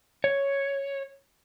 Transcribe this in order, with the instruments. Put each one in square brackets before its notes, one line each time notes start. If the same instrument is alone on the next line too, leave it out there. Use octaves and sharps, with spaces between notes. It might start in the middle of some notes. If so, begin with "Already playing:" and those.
[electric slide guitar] C#5